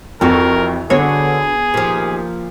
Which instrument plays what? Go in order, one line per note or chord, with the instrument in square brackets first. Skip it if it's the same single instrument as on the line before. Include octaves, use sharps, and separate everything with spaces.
[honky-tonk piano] F2 C#6 [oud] E3 F#4 [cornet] A#4
[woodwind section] D3 [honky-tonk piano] B3 [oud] D4 F#4 C#5 [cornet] G#4
[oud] A#2 F3 [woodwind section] D#3 G4 C5